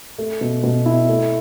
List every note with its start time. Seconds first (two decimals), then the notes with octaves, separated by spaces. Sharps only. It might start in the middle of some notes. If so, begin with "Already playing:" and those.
0.18 A3
0.41 B2
0.64 B2
0.86 E4
1.09 A3